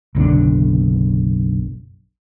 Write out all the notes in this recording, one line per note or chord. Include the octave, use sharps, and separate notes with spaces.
F#1 B1 D3 D4